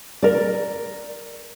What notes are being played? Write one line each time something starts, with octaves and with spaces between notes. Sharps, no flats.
A#4 D5